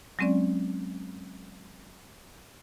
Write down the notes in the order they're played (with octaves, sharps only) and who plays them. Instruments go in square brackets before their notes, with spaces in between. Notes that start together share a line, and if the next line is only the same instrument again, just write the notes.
[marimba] F#3 G#3 C4 C#4 D5